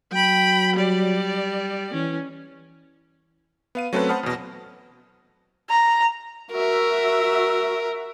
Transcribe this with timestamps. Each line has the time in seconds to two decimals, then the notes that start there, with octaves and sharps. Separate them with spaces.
0.12 F#3 G5 B5
0.76 G3 D5
1.94 E3 C#4
3.75 B3 F5 D#7
3.93 F#3 A3 C4 C#4 A4 B4
4.09 C5 F#5 A5 B5 D#6 F6
4.23 E2 B2
5.69 A#5
6.52 F#4 A#4 E5